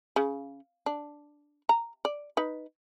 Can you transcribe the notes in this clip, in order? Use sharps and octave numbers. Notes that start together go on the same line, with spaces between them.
C#3
D4
A#5
D5
D#4 B4